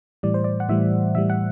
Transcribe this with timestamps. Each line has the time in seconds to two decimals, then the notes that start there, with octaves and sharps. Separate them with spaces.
0.23 A2 E3 G3 D5
0.34 C5
0.44 D5
0.60 F#5
0.69 A2 E3 G3 E5
1.15 A2 E3 G3 E5
1.30 F#5